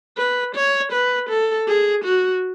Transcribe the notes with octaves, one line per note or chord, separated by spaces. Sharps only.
B4
C#5
B4
A4
G#4
F#4